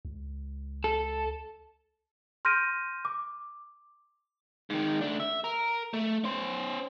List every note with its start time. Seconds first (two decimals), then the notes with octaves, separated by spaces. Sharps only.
0.05 C#2
0.84 A4
2.45 C6 F6 G6 A#6 D7 D#7
3.05 D6
4.70 G#2 D#3
5.01 A3 D4
5.20 E5
5.44 A#4
5.94 A3
6.24 C#4 C5